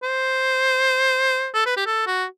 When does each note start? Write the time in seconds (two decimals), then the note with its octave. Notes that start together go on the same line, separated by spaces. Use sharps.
0.03 C5
1.54 A4
1.66 B4
1.77 G4
1.86 A4
2.06 F#4